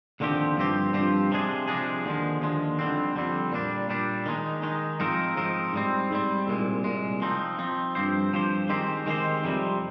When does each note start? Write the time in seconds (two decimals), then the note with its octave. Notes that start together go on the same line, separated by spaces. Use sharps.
0.20 D#2 D3 F3 C4 G4
0.57 G2 F3 C4 G4
0.93 G2 F3 C4 G4
1.31 C3 F3 G#3 D4 G#4
1.68 C3 F3 G#3 D4 G#4
2.05 D#2 D3 F3 G#3
2.41 D#2 D3 F3 G#3
2.79 F2 D3 G3 C4
3.16 F2 D3 G3 C4
3.52 A#2 G3 D4
3.90 A#2 G3 D4
4.26 D#3 G#3 D#4
4.63 D#3 G#3 D#4
5.00 G#2 F3 C4 D#4 A#4
5.37 G#2 F3 C4 D#4 A#4
5.74 G#2 G3 C4
6.11 G#2 G3 C4
6.48 C2 A#2 G#3
6.84 C2 A#2 G#3
7.22 F3 C4 D#4
7.59 F3 C4 D#4
7.95 G2 F3 C4 G4 C5
8.33 G2 F3 C4 G4 C5
8.69 D#3 G#3 C4 G4 C5
9.06 D#3 G#3 C4 G4 C5
9.44 F2 C3 G3 C4